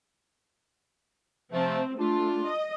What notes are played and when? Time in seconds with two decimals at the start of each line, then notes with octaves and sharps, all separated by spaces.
1.52 C3 F3 A3 C4
1.99 A3 D4 F4
2.45 D#5